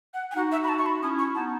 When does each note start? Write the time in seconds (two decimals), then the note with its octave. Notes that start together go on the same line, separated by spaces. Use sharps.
0.14 F#5
0.31 G#5
0.36 D#4 F#4 F#5
0.52 E5
0.64 B5
0.69 A5
0.78 C#6
0.86 B5
1.01 C#4 E4 D#6
1.19 C#6
1.35 B3 D#4 A5